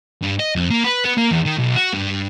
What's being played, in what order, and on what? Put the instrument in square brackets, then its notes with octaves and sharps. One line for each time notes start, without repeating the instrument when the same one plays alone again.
[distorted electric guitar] G2
D#5
F2
A#3
B4
B3
A#3
E2
D#3
B1
F#4
G2